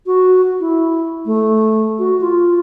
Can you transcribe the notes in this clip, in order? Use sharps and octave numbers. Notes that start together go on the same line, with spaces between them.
F#4
E4
A3
F#4
F4